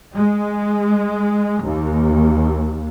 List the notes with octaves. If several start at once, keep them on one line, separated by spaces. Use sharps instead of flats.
G#3
D#2